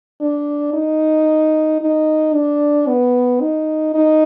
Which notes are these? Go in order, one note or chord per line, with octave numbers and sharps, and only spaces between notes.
D4
D#4
D#4
D4
B3
D#4
D#4